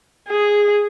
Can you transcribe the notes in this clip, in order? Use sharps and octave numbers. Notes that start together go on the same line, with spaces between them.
G#4